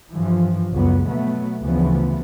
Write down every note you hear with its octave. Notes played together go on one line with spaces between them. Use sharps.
G2 E3 F3
C#2 F#2 F#3 B3
B2 F#3 A3 B3
D2 C#3 E3 F3 B3